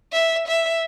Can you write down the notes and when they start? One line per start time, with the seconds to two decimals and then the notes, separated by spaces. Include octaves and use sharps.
0.13 E5
0.47 E5